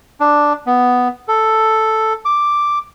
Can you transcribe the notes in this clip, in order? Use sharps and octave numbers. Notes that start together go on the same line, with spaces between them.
D4
B3
A4
D6